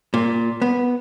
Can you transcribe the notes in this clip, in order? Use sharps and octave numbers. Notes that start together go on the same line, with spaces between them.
A#2
B3